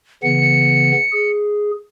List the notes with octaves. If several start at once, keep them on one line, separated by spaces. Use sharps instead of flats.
C#3 E3 B3 C#7
G#4